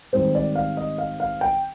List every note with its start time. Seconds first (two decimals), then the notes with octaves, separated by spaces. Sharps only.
0.13 G#2 D#3 G3 C4 C5
0.35 D5
0.55 F5
0.77 D#5
0.98 F5
1.20 F5
1.41 G5